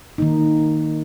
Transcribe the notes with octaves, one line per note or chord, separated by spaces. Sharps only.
D#3 A#3 D#4